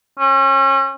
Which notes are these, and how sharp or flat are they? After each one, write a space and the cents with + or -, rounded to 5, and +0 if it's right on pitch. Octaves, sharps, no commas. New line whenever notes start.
C#4 -35